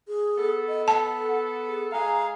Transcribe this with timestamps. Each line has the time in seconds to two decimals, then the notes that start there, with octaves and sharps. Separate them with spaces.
0.08 G#4
0.38 B3 A4
0.69 D#5
0.88 F#5 A5
1.69 G#4
1.92 G#3 G#4 F5 A#5